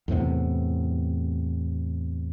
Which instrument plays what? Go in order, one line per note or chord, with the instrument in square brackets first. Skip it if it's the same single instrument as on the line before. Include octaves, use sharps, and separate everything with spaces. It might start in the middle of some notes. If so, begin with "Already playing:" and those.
[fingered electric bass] E2 A2 C3 B3